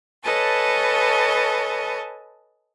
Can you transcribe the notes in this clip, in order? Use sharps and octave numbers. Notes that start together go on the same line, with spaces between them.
A4 B4 C#5 D#5 G#5 A5